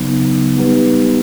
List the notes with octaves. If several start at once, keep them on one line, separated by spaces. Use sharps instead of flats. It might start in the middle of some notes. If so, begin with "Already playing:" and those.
Already playing: C#3 F#3 B3 D#4
G3 B3 D#4 G4 B4